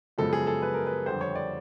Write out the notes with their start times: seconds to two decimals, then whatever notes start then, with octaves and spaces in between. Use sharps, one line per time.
0.18 F#2 C#3 F3 G#3 B3 A4
0.33 G#4
0.47 A4
0.62 B4
0.74 A#4
0.86 B4
1.06 F2 D3 G3 C5
1.21 C#5
1.35 D5